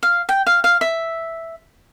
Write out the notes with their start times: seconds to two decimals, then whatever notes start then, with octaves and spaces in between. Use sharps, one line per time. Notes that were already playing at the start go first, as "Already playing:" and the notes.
0.03 F5
0.29 G5
0.47 F5
0.64 F5
0.81 E5